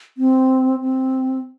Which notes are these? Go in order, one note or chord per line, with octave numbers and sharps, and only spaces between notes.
C4
C4